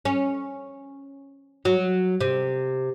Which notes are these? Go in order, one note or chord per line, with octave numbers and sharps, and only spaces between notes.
C#4
F#3
C3